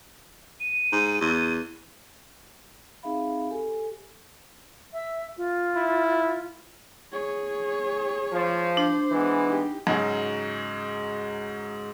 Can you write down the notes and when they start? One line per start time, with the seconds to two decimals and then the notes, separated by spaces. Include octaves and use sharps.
0.60 D#7
0.92 G#2
1.21 E2
3.03 C4 D#4 G#4 E5 F5 B5
3.51 G4 A4 G#5
4.93 E5
5.37 F4
5.76 E4
7.12 G#4 C#5
8.32 F3
8.77 D4 C5
9.11 E3 G#3 B3
9.48 D#4 G4
9.87 G#2 C#3 F#3 D#4 F#4 G#4